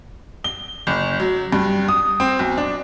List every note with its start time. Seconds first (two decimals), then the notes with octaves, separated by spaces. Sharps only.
0.44 G7
0.87 F#1
1.20 F#3
1.52 G2
1.88 D#6
2.20 C4
2.39 B1
2.58 D4